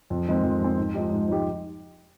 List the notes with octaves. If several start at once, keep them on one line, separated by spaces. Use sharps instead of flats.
F2
D#3 G#3 C4
F2
D#3 G#3 C4
G#2
F3 G#3 D#4 G4
G#2
F3 G#3 D#4 G4